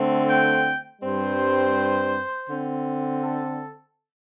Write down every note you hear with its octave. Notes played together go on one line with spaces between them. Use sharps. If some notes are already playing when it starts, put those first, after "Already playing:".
Already playing: D3 A3 C4
G5
G2 G3 C4 C5
D3 C4
A4